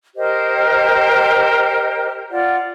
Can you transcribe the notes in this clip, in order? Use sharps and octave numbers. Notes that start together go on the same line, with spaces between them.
G4 A#4 C5 D#5
F4 D5 F#5